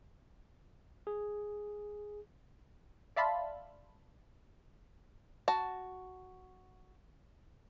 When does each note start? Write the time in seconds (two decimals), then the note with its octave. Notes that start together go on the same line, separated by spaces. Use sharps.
1.07 G#4
3.16 D5 E5 F5 A5 B5 C6
5.48 F#4 A5